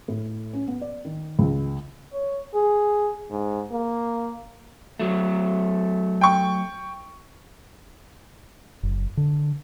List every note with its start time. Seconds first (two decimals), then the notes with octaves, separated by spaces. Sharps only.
0.08 A2
0.53 C#4
0.68 B3
0.81 D5
1.05 D#3
1.39 C#2
2.13 C#5
2.55 G#4
3.31 G#2
3.72 A#3
5.00 F#3 A3
6.21 G5 C#6
8.83 F#1
9.17 D3